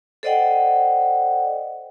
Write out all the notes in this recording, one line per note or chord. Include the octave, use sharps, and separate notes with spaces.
A4 C5 D5 D#5 F#5 G5